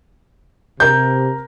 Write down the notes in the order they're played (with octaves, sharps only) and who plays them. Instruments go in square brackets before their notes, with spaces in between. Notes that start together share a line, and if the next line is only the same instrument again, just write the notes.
[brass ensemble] C3 [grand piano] A#4 G6